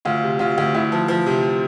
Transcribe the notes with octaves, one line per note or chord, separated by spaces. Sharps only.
D2 F4
C3
D2 F4
D2
D2 E4
F3
F3
C3